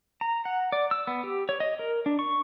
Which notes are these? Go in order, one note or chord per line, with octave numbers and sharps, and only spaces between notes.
A#5
F#5
D5
E6
B3
G4
C#5
D#5
A#4
D4
C#6